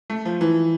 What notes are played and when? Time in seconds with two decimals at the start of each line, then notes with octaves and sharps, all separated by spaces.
0.10 A3
0.25 F3
0.41 E3